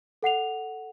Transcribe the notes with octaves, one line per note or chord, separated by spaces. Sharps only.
A4 F#5 C7 F7